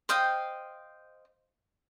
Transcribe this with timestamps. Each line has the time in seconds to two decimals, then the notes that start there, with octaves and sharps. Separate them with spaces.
0.09 C5 D#5 F5 G5